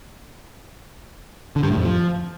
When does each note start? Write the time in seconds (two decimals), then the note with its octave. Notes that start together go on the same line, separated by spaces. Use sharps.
1.56 D3
1.63 G2
1.70 A2
1.77 F2
1.84 F3